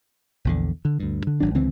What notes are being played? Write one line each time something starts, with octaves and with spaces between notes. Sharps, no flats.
A#1 E2 D3
D3
D2 G2
D3
G#1 F#3 D4
C#2 D3 E3 C4